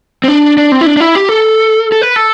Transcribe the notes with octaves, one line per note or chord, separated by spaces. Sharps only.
C4
D4
D4
C4
E4
D4
D4
E4
G4
A4
A4
B4
A4